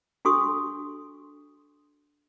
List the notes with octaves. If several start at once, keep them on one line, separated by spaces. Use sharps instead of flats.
D4 F#4 A4 C6 C#6 D#6